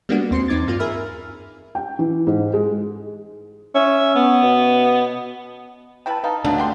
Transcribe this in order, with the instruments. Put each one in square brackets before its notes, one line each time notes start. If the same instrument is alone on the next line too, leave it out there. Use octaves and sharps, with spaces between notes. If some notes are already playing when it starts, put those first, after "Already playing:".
[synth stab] G3 G#3 A#3 B3 D4 F#4
D#2 C4 C6 C7 C#7
E2 C4 D#4 D6 G#6 A6
G2 A#3 F4
G#4 A#4 E5 B5 F6
[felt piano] G5
E3
G#2
G#3
[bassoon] C#4 [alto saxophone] E5
[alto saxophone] B3
[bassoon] B2
[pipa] C#3 E4 B4 [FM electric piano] G5 A5
[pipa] D#4 [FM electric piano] B4 F5 A5
[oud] D2 [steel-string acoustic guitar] D4
[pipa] G4 G5 C6